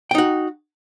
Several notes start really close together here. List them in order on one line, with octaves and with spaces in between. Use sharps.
G5 D#4 F#4